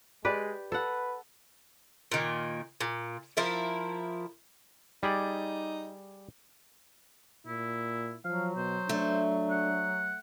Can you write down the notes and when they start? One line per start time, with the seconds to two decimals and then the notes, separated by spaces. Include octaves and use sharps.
0.25 G#3 G4 B4 D5
0.72 A4 B4 F#5
2.12 A#2 D#3
2.81 A#2
3.37 F3 E4 A#4
5.03 G3 D#4 G#4 D5
7.46 A#2 E4
8.25 F3 F#3 F5
8.56 B2 C5
8.89 A3 D4
9.50 F#5